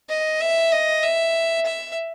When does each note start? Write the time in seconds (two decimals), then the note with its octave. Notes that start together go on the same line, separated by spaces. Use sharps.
0.09 D#5
0.41 E5
0.72 D#5
1.03 E5
1.66 E5